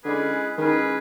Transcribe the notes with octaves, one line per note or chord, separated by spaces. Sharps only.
D3 G#3 C#4 E4 G#4 B4
D#3 G#3 C#4 E4 G#4 B4